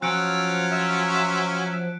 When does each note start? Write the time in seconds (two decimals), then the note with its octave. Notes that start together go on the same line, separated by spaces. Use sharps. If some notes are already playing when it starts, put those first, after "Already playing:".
0.02 F3 F#3 C#4 F4 E6 F#6 C#7 D7
0.71 E5